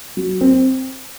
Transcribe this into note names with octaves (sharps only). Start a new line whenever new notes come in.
F#3
C4